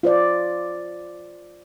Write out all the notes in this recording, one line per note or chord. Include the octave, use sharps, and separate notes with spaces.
F4 C5 D5